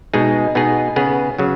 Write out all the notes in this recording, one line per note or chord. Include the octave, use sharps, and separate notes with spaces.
B2 G#3 D#4 G#4
B2 B3 D#4 G#4
C#3 B3 G#4
C#3 F#3